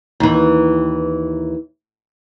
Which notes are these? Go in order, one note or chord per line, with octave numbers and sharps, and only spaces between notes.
D#2 E3